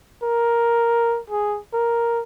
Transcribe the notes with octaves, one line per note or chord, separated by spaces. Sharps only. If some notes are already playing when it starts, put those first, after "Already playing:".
A#4
G#4
A#4